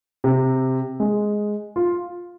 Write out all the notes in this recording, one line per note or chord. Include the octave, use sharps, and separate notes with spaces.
C3
G#3
F4